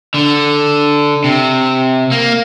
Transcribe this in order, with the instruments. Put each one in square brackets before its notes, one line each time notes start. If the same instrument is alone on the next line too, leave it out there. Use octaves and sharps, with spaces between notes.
[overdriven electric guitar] D3
C3
A#3